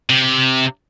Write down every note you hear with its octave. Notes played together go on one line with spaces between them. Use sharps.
C3